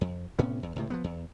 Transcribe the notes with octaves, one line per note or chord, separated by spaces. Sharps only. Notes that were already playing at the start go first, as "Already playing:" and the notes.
F2
A2 C3 B3 C#4
E2
C#2 A2 C3
F3 G3 B3
E2